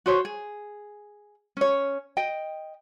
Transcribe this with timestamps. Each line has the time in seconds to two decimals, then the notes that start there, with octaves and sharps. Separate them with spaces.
0.06 F#4 C5 C#5
0.25 G#4
1.57 C#4 C#5
2.17 D#5 G5